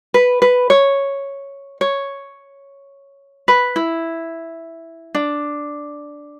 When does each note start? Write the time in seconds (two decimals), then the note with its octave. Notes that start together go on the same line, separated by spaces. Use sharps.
0.14 B4
0.42 B4
0.70 C#5
1.81 C#5
3.48 B4
3.76 E4
5.15 D4